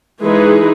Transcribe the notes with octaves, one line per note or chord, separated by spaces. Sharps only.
E3 G#3 D#4 G#4 B4